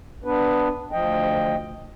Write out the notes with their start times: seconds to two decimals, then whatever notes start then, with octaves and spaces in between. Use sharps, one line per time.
0.24 B3 D4 B4
0.92 D2 F3 D#5 G5